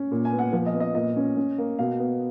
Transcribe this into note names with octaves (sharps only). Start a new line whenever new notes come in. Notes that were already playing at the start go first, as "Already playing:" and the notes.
Already playing: C#4
A#2
G#5
B3
F#5
F3
D#5
B3
D#5
A#2 D#5
C#4
C#4
A#3
B2 F5
B3